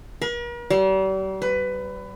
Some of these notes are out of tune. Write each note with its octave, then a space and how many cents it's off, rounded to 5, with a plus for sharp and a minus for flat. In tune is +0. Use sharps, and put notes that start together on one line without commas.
A#4 +45
G3 -40
B4 +20